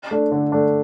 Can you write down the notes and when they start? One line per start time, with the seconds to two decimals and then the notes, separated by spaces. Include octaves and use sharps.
0.11 A3 D4
0.32 D3
0.52 A3 D4